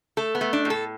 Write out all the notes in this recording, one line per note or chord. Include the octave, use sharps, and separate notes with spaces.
A3 A4
B3
A3
D4
A2
A4